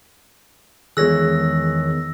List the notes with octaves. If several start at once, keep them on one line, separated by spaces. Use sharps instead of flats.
E2 D#3 G#3 G#4 C#5 E6 F#6 A#6